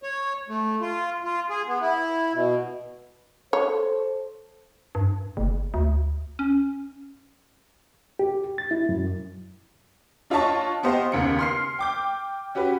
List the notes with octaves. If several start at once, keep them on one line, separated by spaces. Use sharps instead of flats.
C#5
A3
F4
F4
G#4
B3
E4
B2
A4 C5 C#5
G2
F#1
D2
C#4
G4
A6
E4
F#2
D4 F4 C#5 D#5 A5 C#6
B3 G4 C5 D#5 F5
D#2 C#3 B3 A#4 C#7
C6 F6 C7
G5 D6 G6
C#4 F#4 G4 B4